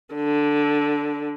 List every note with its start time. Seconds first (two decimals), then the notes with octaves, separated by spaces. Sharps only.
0.15 D3